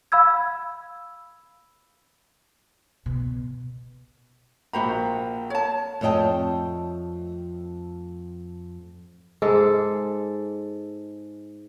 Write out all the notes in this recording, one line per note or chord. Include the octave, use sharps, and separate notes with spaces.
F5 B5 E6 G#6
B2
A#1 F#4 C5 G5 A#5 B5
C#5 A5
F2 A3 C#5 D#5 G5 A5
G#2 G#3 A4